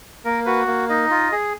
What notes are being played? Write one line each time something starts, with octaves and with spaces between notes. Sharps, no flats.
A#3 A#4
F#4 B4
A#3
D#4 D#5
F4
G#4